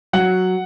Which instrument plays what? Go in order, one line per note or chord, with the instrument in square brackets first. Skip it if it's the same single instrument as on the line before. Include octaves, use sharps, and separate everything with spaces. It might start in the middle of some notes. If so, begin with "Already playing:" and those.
[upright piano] F#3 F#5